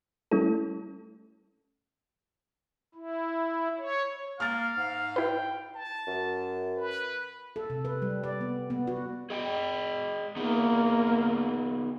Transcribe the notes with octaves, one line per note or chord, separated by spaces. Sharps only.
G3 A3 C#4 E4 A4
E4
C#5
A#3 F5 F6 A6
G#2
E4 B4 G5
A5
F#2
B4
A4
C3
B4
G3
D5
B3
B3
F#4
G#4 D#5 G5
A#3 B3 D#4 G#4